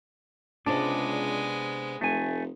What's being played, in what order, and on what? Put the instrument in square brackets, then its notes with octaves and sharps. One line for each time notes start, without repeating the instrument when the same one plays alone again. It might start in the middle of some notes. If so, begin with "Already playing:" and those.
[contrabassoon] C#2 [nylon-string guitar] C3 D4 [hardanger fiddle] G#3 B3 [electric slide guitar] D5
[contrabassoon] F1 [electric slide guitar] A3 G#5